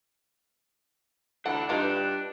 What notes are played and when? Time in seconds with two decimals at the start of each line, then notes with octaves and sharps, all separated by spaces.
1.46 D2 E3 D4 A4 F#5
1.69 G2 D#4 F4 B4